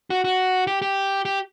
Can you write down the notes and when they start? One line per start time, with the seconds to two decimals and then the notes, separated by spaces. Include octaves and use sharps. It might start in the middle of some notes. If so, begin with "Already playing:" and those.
0.10 F#4
0.24 F#4
0.67 G4
0.82 G4
1.25 G4